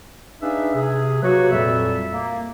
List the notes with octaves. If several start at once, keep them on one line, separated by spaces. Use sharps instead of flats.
D4 D#4 G#4 B4 E5 F5
C3 G#4
F#3 A#3 F#4 G4 B4 C#5
F2 A#2 G3 A4 E5
A#3